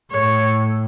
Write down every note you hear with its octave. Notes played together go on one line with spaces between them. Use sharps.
A2 C#5